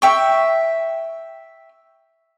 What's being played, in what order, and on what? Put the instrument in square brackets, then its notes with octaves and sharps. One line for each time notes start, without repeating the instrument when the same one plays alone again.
[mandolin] E5 G5 C#6